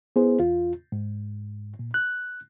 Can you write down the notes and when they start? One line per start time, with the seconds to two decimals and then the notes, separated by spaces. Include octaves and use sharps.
0.16 B3 E4 G#4 C5
0.39 E2 F4
0.92 G#2
1.79 A#2
1.94 F#6